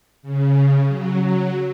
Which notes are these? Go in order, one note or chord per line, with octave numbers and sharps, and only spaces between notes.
C#3
F#3
F#3